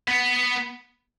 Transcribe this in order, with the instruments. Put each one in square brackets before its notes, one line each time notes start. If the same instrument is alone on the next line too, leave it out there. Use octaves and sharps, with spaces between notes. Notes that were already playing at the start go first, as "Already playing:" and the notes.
[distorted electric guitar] B3